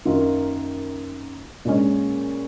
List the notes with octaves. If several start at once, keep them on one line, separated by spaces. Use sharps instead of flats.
F#2 D#3 A#3 F4
A#2 G#3 C#4